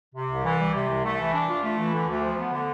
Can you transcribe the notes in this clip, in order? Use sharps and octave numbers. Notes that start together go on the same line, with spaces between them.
C3
C2
E3
G3
C3
C2
A3
E3
D4
F4
A3
E3
D3
D2
F3
B3
D3